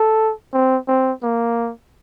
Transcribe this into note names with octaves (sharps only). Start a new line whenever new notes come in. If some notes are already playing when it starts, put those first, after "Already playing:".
Already playing: A4
C4
C4
A#3